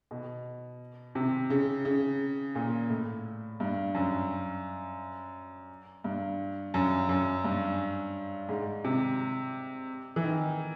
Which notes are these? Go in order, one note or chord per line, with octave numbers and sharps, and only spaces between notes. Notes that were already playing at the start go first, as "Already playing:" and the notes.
B2
C3
C#3
C#3
A#2
A2
G2
F#2
G2
F#2
F#2
G2
G#2
C3
E3
D#3